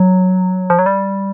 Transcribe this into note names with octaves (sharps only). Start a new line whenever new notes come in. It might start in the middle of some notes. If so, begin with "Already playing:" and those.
Already playing: F#3
F3
F#3
G3